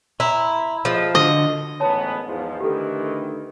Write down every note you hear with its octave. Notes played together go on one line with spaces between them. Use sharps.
E4 A#5 C6
F3 G#4 A4 D#5
D3 F#4 D#5
A1 G#2 B3 C#5 A5
E2 G#2 F3
D2 D#3 E3 G4 A4